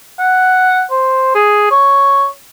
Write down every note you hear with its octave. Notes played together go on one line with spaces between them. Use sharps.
F#5
C5
G#4
C#5